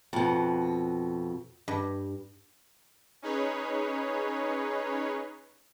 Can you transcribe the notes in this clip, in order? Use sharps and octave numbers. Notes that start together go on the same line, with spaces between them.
F2 B2
G2
C#4 D#4 G#4 B4 C#5